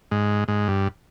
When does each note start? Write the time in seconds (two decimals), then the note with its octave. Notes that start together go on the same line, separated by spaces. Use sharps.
0.11 G#2
0.48 G#2
0.68 G2